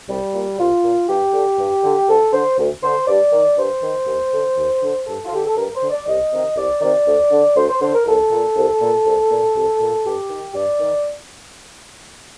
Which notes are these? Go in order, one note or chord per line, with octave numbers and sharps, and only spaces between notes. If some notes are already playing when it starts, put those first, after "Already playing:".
C2 G3
A#2
C2 F4
A#2
G2 G4
D3
G2
D3
D2 A4
D3 C5
D2
D3 C5
G2 D5
D#3
G2 C5
D#3
D#2
D3
D#2
D3
G2 A4
F4
D3 G4
A4
G2 A#4
C5
D3
D5
C2 D#5
C3 D#3
C2 D5
C3 D#3 D5
D2
D3
D2 C5
C5
D3 C5
A#4
C2 A4
A#2
C2
A#2
C2
A#2
C2
A#2
G2 G4
D#3
G2 D5
D#3